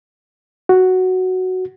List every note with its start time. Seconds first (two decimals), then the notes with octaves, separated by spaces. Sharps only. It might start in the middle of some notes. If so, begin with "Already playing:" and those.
0.69 F#4